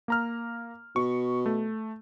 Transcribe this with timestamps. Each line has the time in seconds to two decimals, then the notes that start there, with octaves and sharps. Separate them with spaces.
0.08 A#3 A#5 F6
0.96 B2 C#6
1.46 A3